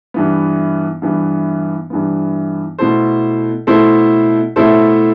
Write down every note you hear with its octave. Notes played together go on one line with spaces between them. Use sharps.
G2 E3 B3
G2 E3 B3
G2 E3 B3
B2 A3 E4 A4 C5
B2 A3 E4 A4 C5
B2 A3 E4 A4 C5